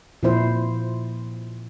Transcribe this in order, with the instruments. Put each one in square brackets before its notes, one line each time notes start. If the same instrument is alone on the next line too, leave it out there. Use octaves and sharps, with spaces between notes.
[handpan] A#2 F3 E4 C5